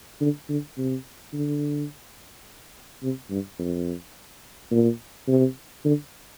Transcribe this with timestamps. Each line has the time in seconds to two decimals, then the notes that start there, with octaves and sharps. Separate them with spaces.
0.21 D3
0.49 D3
0.78 C3
1.33 D3
3.03 C3
3.31 G2
3.59 F2
4.71 A#2
5.28 C3
5.85 D3